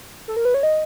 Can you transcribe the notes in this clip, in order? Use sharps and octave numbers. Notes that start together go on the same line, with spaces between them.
A4
A#4
B4
C#5
D#5